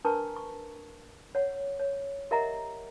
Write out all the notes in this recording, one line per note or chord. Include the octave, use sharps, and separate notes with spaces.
D4 A#4 B4 A5 A#5 C#6
C#6
C#5 F#5
C#5
G4 A#4 D#5 E5 F#5 A#5